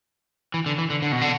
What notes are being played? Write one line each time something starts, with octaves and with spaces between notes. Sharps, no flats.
E3
D3
E3
D3
D3
B2
D3